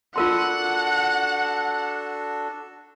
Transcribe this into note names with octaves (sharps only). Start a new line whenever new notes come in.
D4 F4 F#4 A4 A#4 F#5 C6